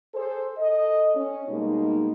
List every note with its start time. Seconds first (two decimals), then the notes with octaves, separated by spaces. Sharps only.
0.14 G#4 A4 C5
0.56 A4 D#5
1.15 C#4
1.48 B2 G3 G#3 A#3 D#4